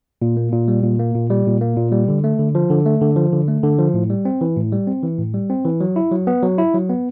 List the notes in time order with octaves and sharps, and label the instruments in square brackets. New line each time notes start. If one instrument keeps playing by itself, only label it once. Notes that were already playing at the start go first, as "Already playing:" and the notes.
[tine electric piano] A#2
A#3
A#2
G3
A#2
A#3
A#2
G3
A#2
A#3
A#2
G3
D3
A3
D3
F3
D3
A3
D3
F3
D3
A3
D3
F3
A2
G3
C4
E3
A2
G3
C4
E3
A2
G3
C4
E3
F#3
E4
F#3
B3
F#3
E4
F#3
B3